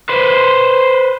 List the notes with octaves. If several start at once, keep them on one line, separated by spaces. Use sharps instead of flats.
B4 C5